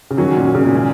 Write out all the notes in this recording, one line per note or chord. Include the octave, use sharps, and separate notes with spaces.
C#3
F#2 D#3 F#3 C#4 F#4
A#2
C#3
A#2
D#3 G#3 C#4